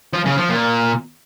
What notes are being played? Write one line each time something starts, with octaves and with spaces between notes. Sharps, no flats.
F3
C#3
F3
A#2